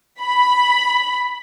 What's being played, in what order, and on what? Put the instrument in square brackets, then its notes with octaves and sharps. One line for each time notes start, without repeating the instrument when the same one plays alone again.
[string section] B5